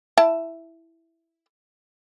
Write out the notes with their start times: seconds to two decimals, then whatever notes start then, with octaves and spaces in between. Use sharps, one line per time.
0.18 E4 A5